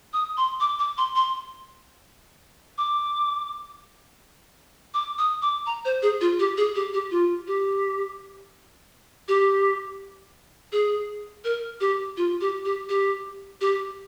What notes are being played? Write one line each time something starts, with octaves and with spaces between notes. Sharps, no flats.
D#6
C6
D6
D6
C6
C6
D6
D6
D#6
D6
A#5
C5
G#4
F4
G4
G#4
G4
G4
F4
G4
G4
G#4
A#4
G4
F4
G4
G4
G4
G4